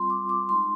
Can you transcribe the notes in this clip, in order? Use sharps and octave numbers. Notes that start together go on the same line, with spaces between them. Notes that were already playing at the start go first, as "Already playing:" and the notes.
Already playing: G3 C4 F4 C6
D6
D6
G#3 D#4 C6